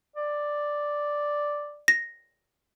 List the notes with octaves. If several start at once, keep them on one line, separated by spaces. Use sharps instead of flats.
D5
A#6